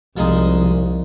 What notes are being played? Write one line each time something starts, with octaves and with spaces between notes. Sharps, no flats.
C2 F3 G#3 D#4